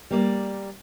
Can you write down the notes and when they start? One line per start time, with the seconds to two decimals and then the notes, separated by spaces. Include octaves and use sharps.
0.11 G3 A#3 D5